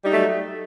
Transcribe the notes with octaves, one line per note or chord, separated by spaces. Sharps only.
F#3 G3 A3 D#4